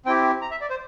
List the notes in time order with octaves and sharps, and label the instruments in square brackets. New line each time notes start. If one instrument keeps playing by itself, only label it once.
[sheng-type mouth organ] C4 E4 G4 G5
A#5
E5
D5
C5